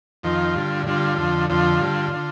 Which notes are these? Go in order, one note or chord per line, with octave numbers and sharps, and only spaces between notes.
F2 D#3 F4
G2 D3
G2 D3 F4
F2 D3
F2 D3 F4
G2 D3
D3